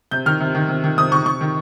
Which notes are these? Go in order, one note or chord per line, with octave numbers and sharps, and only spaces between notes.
C3 G6
D#3 F6
C3
D#3
C3
D#3
C3 D#6
D#3 C#6
C3 C#6
D#3